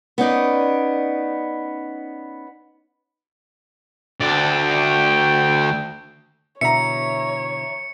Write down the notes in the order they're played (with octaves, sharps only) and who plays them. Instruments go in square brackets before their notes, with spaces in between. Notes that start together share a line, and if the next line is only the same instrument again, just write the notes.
[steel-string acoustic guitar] B3 C#4 D#4 D5
[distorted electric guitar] D2 D5 [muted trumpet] G5
[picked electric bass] B2 D3 E3 [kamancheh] C#5 [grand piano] E5 A#5 [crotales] C#7